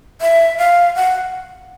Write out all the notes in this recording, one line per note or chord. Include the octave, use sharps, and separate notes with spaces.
E5
F5
F#5